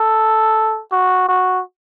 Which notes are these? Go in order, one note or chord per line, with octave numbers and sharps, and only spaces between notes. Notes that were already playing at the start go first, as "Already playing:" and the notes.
Already playing: A4
F#4
F#4